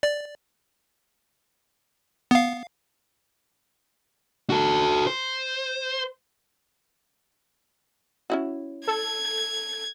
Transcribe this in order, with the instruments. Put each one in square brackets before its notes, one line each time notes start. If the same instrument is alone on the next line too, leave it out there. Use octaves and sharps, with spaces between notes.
[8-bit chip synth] D5
B3 F5
[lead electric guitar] F#4 A4
C5
[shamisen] C#4 E4 F#4
[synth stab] A4 [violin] G#6